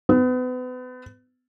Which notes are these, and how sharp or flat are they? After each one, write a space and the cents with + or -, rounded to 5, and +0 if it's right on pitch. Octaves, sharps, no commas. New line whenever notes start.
B3 +35